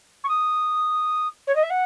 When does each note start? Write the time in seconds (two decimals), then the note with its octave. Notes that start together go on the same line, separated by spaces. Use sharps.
0.24 C#6
0.28 D#6
1.47 C#5
1.55 D#5
1.63 E5
1.70 F#5